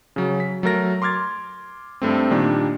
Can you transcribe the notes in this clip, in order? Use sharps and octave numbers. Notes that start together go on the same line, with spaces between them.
C#3 F#3
B6
F#3 A3 A#4 A#6
C6 D6 F6 G#6 A6
G2 A3 C4
A#2 D#3 G3 A#3 D4